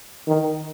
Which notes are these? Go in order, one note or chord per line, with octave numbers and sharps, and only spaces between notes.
D#3